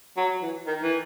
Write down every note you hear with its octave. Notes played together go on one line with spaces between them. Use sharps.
F#3
E3
D#3
E3